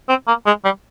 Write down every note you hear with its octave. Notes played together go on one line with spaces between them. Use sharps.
C4
A#3
G#3
G3